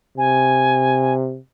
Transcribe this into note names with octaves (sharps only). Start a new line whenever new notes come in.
C3 G#5